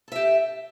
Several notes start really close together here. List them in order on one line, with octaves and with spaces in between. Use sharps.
A4 E5 G4